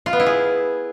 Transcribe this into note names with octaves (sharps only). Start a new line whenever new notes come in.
F4
B3
E4
G#4